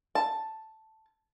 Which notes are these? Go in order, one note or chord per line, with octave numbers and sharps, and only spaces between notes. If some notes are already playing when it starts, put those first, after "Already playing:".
A5